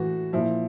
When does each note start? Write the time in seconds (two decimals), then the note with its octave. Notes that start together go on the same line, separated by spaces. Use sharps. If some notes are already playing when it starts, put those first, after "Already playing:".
Already playing: A2 E3 F#4
0.33 A#2 F3 E4